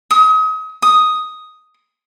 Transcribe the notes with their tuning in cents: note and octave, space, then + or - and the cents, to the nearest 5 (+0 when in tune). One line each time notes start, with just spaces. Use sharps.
D#6 +35
D#6 +5